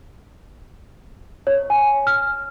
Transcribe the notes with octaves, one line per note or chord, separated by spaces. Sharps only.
C#5
G#5
F6